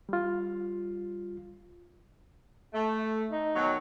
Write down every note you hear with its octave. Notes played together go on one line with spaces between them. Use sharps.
G3 F4
A3
D#4
B2 D#3 F#3